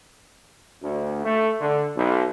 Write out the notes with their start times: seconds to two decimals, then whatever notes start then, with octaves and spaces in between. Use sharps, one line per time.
0.83 D2
1.25 A3
1.61 D3
1.96 B1